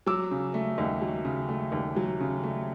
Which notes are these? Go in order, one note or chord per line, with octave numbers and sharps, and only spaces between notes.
F#3 D6 E6
C#3
A3
D#2
F#3
C#3
A3
D#2
F#3
C#3
A3